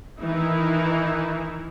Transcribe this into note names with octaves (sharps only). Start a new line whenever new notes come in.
D#3 E3 D#4 E4